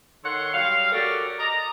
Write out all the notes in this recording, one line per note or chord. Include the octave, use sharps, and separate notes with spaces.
D#3 A4 C#5 F#5 C6
F#3 G3 F5
F#4 G4 A4 A#4 D5
D5 D#5 A#5